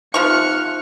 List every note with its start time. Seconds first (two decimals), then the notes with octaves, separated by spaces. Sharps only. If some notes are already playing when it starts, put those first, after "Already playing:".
0.14 C3 F3 D#4 F4 F#5 C#6 F6 C#7